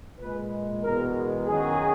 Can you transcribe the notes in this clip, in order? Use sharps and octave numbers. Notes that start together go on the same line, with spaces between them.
A#2 G#3 B4
E2 B2 G#3 A#4
F#2 D#3 F#3 G#4